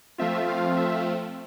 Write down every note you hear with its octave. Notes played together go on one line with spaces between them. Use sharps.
F3 A3 C4 F4 E5
F5
E5